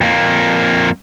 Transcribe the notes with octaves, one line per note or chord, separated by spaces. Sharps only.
F2 A#3